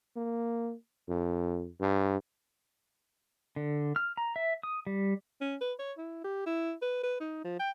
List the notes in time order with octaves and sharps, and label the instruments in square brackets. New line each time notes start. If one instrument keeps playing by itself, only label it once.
[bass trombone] A#3
F2
G2
[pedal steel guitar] D3
F6
A#5
E5
D#6
G3
[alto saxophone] C#4
B4
C#5
E4
G4
E4
B4
B4
D#4
F3
G5